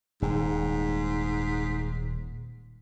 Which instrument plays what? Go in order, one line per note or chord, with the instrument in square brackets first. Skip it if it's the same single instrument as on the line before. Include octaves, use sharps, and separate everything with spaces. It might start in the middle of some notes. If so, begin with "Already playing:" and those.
[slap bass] D#1 [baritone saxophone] G#2